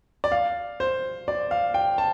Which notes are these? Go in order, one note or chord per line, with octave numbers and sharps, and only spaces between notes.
D5
F5
C5
D5
F5
G5
A5